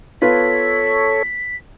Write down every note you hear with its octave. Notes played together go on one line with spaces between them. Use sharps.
B3 F4 A4 B4 C#5 B6